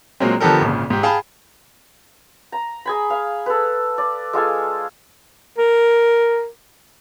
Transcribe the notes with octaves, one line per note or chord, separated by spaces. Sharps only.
A#2 F#3 G#3 A#3 C4
D3 F3 B3 G4 A4 A#4
G#1 A#2 C#3
G#2 G4
G#4 F5 G5 A5 B5
A#5
G#4 G#5 B5
F5
A4 B4
D5
G#3 F4 A4 G#5
A#4